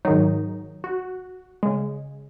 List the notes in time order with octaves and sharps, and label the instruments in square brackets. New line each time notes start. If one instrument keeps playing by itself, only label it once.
[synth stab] G#2 D#3 F#3 D#4
F#4
C#3 G#3